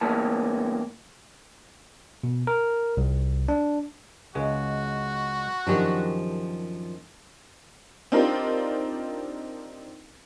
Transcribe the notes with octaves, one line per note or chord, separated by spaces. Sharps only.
E2 A2 A#3 A5
B2
A#4
C2
D4
C#2 G#3 F#4
F#2 D#3 F3 D4 G4
C4 D4 D#4 F4 G4 A#4